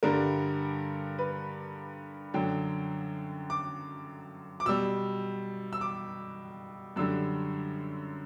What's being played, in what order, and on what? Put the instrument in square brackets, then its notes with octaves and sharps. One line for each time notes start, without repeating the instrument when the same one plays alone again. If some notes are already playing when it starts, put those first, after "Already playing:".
[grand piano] G2 D3 G3 A#4
B4
F#2 D3 F#3 G5
D6
D6
B2 G3 E6
E6
D6
F#2 D3 G3 E6